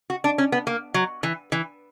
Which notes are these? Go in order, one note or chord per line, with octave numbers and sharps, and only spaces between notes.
F#4
D4
C#4
B3
A#3
F#3
E3
E3